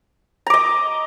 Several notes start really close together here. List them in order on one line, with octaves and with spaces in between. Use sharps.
A#5 D6 D#5